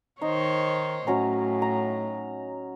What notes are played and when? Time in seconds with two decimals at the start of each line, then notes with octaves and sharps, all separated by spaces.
0.22 D#3 D#4 C5 C#5
1.07 A2 F#3 C#4 A#5
1.62 A#5